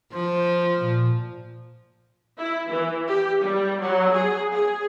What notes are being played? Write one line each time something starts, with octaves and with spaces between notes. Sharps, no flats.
F3 C5
A#2
E4
E3
G4
G3
F#3
G#4
G#4